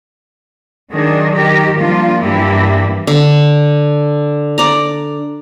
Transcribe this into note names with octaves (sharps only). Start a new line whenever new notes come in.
D#3 F#3 D4 G#4
D#3 G4 A#4
F3 G3 A#3 D4 F4
G2 E3 A#3 D4 E4 G4
D3
D5 A#5